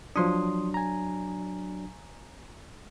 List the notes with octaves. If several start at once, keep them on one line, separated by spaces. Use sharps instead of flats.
F3 F#3 D4 C6 D#6
G#5 A#5